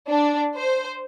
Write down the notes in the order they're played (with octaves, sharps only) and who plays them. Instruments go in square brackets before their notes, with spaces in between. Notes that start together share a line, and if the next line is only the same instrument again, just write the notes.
[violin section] D4
C5